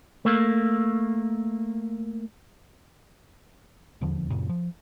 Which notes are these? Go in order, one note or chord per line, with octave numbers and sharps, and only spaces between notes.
A3 A#3
D#1 E2 D3 F3
F#2 A#2 C#3
F3